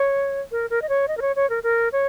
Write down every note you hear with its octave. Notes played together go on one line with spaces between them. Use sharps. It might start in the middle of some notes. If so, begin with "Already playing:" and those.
Already playing: C#5
A#4
A#4
D#5
C#5
D#5
A#4
C#5
C#5
A#4
A#4
C#5